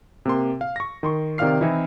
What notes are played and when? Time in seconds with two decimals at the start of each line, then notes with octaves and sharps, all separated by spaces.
0.25 C3 A#3 C6
0.61 F5
0.76 C#6 A#6
1.03 D#3 C6 C#6
1.38 C3 D#3 D5 F5 F6 C7
1.61 E3 C4 D#4 E4